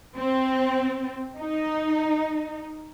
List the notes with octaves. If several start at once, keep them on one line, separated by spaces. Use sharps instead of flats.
C4
D#4